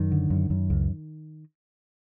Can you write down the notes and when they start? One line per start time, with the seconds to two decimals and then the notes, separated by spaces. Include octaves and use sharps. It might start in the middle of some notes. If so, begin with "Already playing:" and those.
Already playing: F#2 D#3
0.12 D3
0.30 F#2
0.50 F#2
0.70 C#2